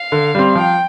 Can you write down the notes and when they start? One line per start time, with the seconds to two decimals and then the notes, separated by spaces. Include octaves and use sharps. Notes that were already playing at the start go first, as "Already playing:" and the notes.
Already playing: F5
0.12 D3
0.35 G3 C4
0.56 F3 G5